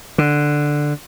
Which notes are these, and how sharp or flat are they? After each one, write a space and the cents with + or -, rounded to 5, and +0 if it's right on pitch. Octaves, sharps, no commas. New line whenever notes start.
D3 +5